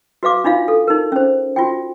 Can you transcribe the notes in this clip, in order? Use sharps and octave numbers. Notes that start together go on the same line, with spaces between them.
F#4 B4 F5 D6
D4 D#4 F4 F5
A4
D#4 A#4
C#4 C5
F4 F#4 G5